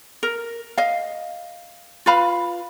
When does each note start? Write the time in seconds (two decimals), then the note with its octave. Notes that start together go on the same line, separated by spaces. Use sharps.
0.23 A#4
0.78 D#5 F5
2.06 F4 B4 F5 B5